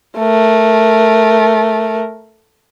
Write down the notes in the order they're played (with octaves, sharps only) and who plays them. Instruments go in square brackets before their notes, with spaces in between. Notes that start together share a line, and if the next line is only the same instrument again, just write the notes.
[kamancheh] A3 A#4